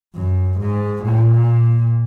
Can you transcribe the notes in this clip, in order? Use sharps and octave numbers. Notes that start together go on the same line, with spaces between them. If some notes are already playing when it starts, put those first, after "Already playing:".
F#2
G#2
A#2